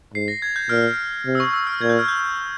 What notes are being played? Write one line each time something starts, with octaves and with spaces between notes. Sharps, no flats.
G#2 C7
A#6
G#6
G6
A#2 F6
C3
E6
C#6
E6
F6
A#2 G#6
G6
F6
G6